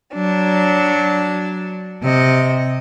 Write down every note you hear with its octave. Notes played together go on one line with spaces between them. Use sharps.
F#3 D4
C3 D#5